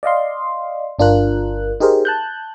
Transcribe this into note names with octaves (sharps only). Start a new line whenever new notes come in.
D5 D#5 F5 C6
G1 D4 F4 A#4 F#6
D#4 G4 G#4 A#4 C5
A5 F#6 G6